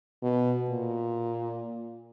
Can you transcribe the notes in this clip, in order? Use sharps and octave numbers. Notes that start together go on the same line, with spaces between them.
B2
A#2